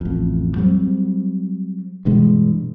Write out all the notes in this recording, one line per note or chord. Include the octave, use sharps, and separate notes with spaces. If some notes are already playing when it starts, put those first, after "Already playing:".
A1 F2
F#3 G3 C4
G2 B2 E3 G#3